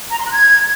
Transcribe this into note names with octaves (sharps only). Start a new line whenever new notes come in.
A#5
C6
F#6
G#6